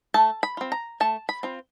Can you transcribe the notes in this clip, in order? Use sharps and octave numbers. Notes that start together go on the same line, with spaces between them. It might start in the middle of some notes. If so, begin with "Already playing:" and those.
A3 A5
B5
C4 F4
A#5
A3 A5
B5
C4 F4